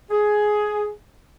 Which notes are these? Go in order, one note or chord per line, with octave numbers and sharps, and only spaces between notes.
G#4